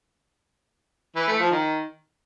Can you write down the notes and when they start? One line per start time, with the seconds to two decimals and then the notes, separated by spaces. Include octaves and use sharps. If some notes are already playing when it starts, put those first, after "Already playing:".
1.16 E3
1.28 A3
1.39 F3
1.51 D#3